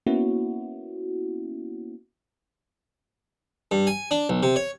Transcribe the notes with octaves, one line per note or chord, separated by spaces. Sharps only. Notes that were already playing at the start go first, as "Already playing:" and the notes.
A#3 B3 C#4 E4 F#4
G2
G#5
D4
B1
C3
C#5